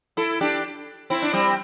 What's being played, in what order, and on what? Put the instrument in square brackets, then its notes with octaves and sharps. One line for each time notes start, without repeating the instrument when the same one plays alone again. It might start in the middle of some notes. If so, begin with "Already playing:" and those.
[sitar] E4 A4
D4 G4
C4 E4
D4
G3 C4